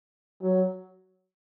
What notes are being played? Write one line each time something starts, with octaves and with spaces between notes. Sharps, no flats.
F#3